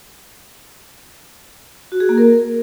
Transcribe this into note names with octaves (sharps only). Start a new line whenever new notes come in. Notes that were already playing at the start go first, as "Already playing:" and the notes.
F#4
G#4
A#3
A#4